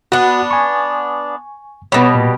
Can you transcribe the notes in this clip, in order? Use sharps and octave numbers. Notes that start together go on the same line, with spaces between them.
B3 D4 F#4 F#5
G#5 C#6
B2 G3 B3 C#5
A#2